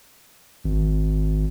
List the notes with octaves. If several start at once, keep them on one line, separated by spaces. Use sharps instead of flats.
G#1